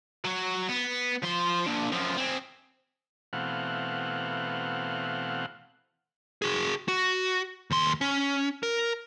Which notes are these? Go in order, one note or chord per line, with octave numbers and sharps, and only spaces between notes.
F#3 F#4
B3
F3 C6
A#3 D4
F#2 F3
C4 G#4
B2 E3 A3 C4 F5 F#5
F#4 G#4
F#4
D#2 C6
C#4
A#4